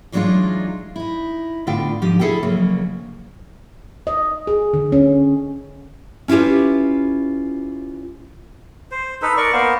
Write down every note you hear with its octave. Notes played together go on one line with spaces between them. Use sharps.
E3 F#3 G#3 D4 D#4 F4
D#4 E4
A2 D3 B3 F4 F5 G5
G#2 D3 F3 G4 D#5
E4 G#4 A4 E5 G5
F2 C#3 F#3 A#3
D#5
G#4
D3
C#4
C#4 E4 F4 G4 B4
C5
D#4 A4 B4
A#4 D5 C#6
A#3 B3 A#4 C5